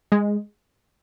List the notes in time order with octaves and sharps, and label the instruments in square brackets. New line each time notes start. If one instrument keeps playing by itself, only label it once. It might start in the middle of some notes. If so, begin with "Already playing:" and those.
[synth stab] G#3